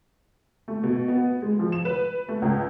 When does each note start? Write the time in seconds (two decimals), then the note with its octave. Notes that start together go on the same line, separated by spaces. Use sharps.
0.68 A3
0.83 B2
1.08 B3
1.42 G#3
1.59 F3
1.72 E7
1.85 B4
2.29 A3
2.42 C#2